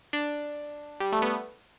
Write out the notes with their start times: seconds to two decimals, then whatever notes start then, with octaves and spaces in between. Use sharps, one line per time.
0.13 D4
1.00 G3
1.12 A3
1.22 B3